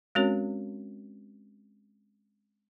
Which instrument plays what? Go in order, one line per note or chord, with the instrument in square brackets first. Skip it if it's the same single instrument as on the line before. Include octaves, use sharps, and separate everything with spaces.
[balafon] G#3 C4 C#4 F#4 A#4 C#5